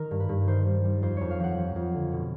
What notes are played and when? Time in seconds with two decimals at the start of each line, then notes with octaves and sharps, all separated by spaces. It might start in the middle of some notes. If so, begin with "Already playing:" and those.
Already playing: D#3 A#4
0.11 G2
0.20 B4
0.29 G2
0.47 D#3 C5
0.66 G3
0.84 G3
1.02 F2 C5
1.17 F2 C#5
1.30 F5
1.40 F3 F#5
1.58 F3
1.76 F2
1.94 D3
2.13 B2